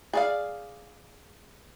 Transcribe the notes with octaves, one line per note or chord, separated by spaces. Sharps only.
G#4 D5 F5